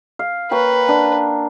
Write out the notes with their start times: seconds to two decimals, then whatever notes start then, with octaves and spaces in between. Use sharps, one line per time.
0.19 F5
0.51 A#3 B4 C#5 G5
0.89 D4